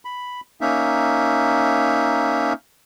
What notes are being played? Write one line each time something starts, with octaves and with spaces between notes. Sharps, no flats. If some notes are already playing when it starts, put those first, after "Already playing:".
B5
A#3 C#4 D#4 E5